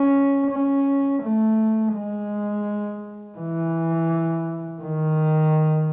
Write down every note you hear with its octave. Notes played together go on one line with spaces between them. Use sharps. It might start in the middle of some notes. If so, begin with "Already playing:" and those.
Already playing: C#4
C#4
A3
G#3
E3
D#3